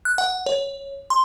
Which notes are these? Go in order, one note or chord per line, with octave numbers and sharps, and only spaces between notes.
F#6
F#5
C#5
C6